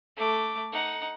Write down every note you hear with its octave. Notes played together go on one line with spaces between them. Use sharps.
A3 D6
D#4 F#5